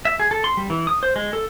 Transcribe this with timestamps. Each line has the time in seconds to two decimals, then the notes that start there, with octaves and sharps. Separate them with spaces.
0.05 E5
0.20 G#4
0.31 A4
0.44 C6
0.57 G3
0.70 E3
0.87 D#6
1.03 C5
1.16 G#3
1.33 A4